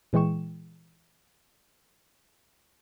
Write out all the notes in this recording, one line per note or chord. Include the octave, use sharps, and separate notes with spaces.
A#2 E3 G#3 G5 C#6 E7